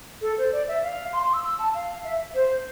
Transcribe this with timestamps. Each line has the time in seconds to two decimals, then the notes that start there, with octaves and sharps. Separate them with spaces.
0.22 A4
0.38 C5
0.52 D5
0.68 E5
0.83 F5
1.13 C6
1.23 C6
1.33 E6
1.44 E6
1.59 A5
1.74 F5
2.04 E5
2.35 C5